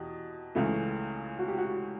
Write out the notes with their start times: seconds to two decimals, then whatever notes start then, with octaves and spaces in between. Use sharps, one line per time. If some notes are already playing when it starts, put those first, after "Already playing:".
Already playing: E2 B2 G4
0.55 C#2 C#3 E3 A3
1.39 F#4
1.48 G4
1.58 F#4